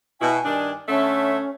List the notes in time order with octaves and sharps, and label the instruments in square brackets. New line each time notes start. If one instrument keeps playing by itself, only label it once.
[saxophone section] B2 E4 [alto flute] G#5
[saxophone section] G2 D#3 D4
[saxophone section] D3 A3 E5 [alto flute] C#4